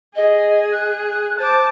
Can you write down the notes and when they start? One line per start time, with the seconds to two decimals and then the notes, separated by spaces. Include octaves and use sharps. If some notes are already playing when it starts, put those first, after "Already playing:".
0.15 G#4 D#5
0.72 F#6
1.39 C5 A5 D6